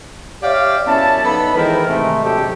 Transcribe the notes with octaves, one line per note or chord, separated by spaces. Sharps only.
G4 C#5 D5 E5 F5
F#2 B3 C#4 E4 A5
B3 D#4 A4 B5
D#3 E3 G#3 E4 A#4 C5
G#2 C3 D#3 G#3 A3
C3 F#3 G#3 D4 G4 A4